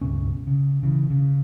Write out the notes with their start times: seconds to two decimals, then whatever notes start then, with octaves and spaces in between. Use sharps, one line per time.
0.01 C#2 G2 B2 C#4
0.47 C#3
0.83 C#3 E3
1.10 C#3